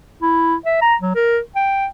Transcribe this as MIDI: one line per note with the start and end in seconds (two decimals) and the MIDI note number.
0.22 0.56 64
0.66 0.78 76
0.82 0.95 82
1.01 1.14 54
1.15 1.39 70
1.56 1.86 79